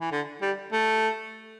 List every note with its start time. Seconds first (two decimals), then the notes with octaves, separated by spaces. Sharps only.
0.01 E3
0.12 D3
0.42 G3
0.73 A3